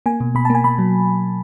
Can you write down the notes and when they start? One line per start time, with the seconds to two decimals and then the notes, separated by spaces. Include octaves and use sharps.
0.06 A#3 G#5
0.20 B2
0.35 B2 B5
0.45 A5
0.50 A#3 G#5
0.64 B2 B5
0.79 F#3